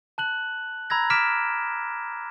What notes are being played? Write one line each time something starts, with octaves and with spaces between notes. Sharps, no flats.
A5 F#6 F#7
A#5 B5 E6 G#6 A#6
D6 F6 B6 D7 E7